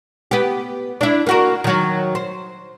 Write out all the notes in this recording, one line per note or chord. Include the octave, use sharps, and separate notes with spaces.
B3 G4
D4 E4
A#3 F#4 A#4
D#3 F#3
C5